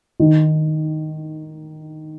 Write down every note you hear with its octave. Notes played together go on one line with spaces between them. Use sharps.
D#3